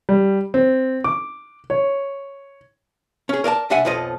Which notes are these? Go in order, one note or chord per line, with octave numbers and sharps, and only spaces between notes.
G3
C4
D6
C#5
C#4 G#4
A#4 D5 F5 A5
C2 D4 E5 F#5 G#5
B1 F2 F3 A4 D#5